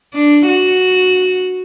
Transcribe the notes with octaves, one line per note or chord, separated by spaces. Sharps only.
D4
F#4